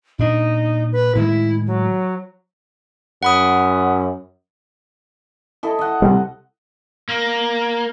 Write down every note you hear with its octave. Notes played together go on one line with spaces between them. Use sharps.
A#2 D4 D#4
B4
A2 D#3 G#3 E4
F#3
F#2 F#5 B5 D#6
E4 A4 D#5
D#5 F#5
C3 G3
A#3